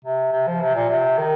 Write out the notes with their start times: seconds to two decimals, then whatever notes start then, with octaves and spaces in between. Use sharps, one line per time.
0.05 C3
0.32 C3
0.47 F3
0.61 C3
0.75 A#2
0.89 C3
1.18 D#3